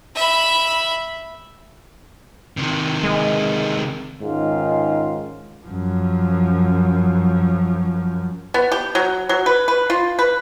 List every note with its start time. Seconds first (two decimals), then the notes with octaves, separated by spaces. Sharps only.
0.16 E5 B5
2.57 C3 D#3
3.03 G#3
4.21 G#2 D#3 G#3 C#4 F4
5.66 F#2 F3
8.54 B3
8.72 G4
8.95 F#3
9.29 F#3
9.46 B4
9.68 B4
9.90 F4
10.19 B4